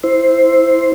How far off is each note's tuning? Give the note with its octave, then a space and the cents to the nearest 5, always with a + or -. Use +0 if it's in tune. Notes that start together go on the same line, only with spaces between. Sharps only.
E4 +0 C5 +0